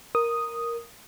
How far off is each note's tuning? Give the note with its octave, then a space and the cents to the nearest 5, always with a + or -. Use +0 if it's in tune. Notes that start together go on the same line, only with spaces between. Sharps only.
A#4 +0 D#6 +0